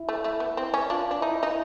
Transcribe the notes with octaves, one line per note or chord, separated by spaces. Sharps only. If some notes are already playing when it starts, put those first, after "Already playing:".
Already playing: E4
A3
A3
B3
C4
C#4
D4 F4
D4
D#4 E4
D#4